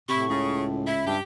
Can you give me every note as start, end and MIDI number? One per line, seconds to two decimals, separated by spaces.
0.09 0.91 45
0.09 0.28 48
0.09 0.23 64
0.09 0.64 85
0.29 1.18 37
0.29 0.64 49
0.87 1.04 64
0.87 1.14 76
1.06 1.18 43
1.06 1.21 67